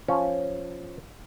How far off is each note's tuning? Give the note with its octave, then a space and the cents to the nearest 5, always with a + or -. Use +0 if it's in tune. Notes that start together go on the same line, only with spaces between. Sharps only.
F3 +0 C#4 +0